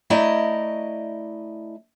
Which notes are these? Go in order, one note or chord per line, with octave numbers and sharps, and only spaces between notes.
A3 E4 D5 D#5 A#5